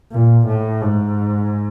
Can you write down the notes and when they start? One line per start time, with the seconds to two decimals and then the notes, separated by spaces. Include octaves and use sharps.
0.12 A#2
0.47 A2
0.81 G#2